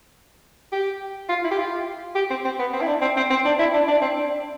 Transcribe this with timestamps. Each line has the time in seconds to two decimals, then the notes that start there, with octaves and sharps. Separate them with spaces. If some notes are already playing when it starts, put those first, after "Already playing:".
0.72 G4
1.29 F4
1.44 E4
1.51 G4
1.59 F4
2.15 G4
2.30 C4
2.45 C4
2.59 B3
2.73 C4
2.81 E4
2.87 D4
3.01 C4
3.17 C4
3.30 C4
3.45 D4
3.59 E4
3.74 D4
3.88 D4
4.02 C4
4.16 D4